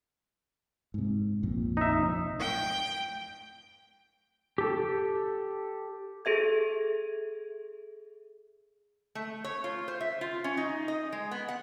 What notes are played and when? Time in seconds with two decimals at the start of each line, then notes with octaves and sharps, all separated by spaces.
0.94 G#2 C3
1.43 A#1 F2 A#2
1.77 D#4 E5
2.40 G5
4.58 G4 A4
6.25 G#4 A4 E5 G#6
9.15 A3
9.44 C#5
9.64 F4
9.88 C5
10.01 E5
10.21 F4
10.44 C#4
10.57 D#4
10.88 D#5
11.12 G#3
11.31 B3
11.48 F#5